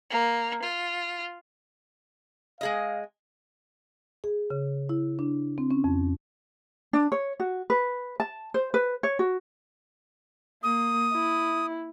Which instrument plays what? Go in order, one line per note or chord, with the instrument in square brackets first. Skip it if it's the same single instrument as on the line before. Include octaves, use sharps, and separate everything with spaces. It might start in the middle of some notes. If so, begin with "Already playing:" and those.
[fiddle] A#3
F4
[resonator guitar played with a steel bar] G#3 G#4 D#5 [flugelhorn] F5
[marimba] G#4
C#3
E4
D4
C4
C#4
F2
[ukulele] D4
C#5
F#4
B4
A5
C5
B4
C#5
F#4
[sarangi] A#3 [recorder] D#6
[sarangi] E4